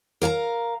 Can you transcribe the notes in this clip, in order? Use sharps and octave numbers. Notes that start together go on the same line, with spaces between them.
A#4 F5 A5 A#5